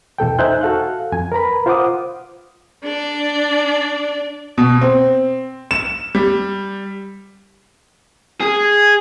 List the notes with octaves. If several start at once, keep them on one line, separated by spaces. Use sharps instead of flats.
E2 B2 A4 G5
D#4 C5 E5 G#5 F#6 G6
F#4 A4 F5 F#6
F2 G#5
A#4 B4 A#5 B5
F4 C5 F5 F#5 D6 D#6
D4 D5
B2
C4
E7
G3
G#4